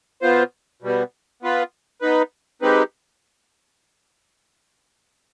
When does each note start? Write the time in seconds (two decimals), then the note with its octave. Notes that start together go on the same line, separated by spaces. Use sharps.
0.22 B2 B3 F4 C5
0.82 B2 G3 B3
1.42 B3 F4 B4
2.01 B3 D#4 B4
2.62 G#3 C4 D#4 G4 B4